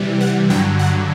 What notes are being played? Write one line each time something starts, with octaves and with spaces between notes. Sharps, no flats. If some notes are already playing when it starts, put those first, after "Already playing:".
Already playing: C3 E3 G3
F#5
G2 D3 F#3 G5
F#5